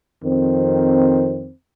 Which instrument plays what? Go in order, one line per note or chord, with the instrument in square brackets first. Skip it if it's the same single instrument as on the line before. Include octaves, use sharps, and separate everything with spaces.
[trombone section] F2 D#3 C4